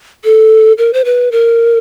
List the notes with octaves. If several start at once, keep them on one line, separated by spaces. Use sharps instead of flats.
A4
A#4
C5
B4
A#4